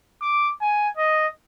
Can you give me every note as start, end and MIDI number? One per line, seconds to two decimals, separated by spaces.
0.22 0.48 86
0.62 0.90 80
0.97 1.27 75